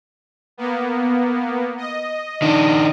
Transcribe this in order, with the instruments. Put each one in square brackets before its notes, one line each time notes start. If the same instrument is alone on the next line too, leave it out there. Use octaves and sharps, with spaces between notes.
[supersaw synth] A#3 B3
D#5
[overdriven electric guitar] D#3 D4